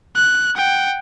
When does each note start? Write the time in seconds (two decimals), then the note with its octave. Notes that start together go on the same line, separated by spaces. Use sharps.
0.16 F#6
0.55 F#5 G5